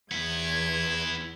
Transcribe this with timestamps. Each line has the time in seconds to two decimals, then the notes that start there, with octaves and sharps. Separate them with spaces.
0.11 E2 B3 E4 G#6